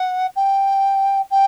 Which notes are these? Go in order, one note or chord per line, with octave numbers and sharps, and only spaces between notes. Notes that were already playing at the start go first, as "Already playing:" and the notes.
Already playing: F#5
G5
G5